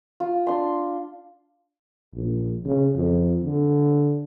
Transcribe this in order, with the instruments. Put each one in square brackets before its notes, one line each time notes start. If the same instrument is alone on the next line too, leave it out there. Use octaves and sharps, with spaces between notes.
[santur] F4
D4 C6
[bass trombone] A#1
C#3
F2
D3